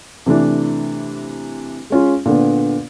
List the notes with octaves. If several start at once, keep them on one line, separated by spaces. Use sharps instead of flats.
C3 E3 A3 D4
G#3 C#4 F4
A#2 D3 B3